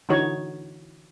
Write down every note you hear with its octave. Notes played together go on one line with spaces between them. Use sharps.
D3 E3 D#4 F#4 C#5